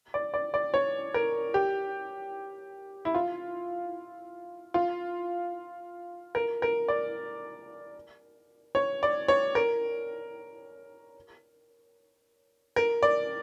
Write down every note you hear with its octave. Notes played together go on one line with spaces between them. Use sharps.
D5
D5
D5
C#5
A#4
G4
E4
F4
F4
A#4
A#4
D5
C#5
D5
C#5
A#4
A#4
D5